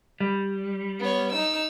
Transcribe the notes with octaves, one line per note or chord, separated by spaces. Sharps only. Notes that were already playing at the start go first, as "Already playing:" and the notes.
G3
B3 C#5
D#4 E6